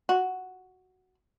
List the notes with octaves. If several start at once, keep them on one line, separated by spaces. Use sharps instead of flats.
F#4